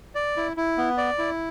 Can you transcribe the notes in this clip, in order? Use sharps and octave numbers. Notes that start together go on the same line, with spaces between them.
D5
E4
E4
B3
D5
E4